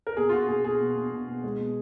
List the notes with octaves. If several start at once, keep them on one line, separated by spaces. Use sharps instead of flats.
A#4
B2 G#4
F4
B2 F#4
B2 G#4
B2 G#4
B2
B2
B2
B2
G#3
B2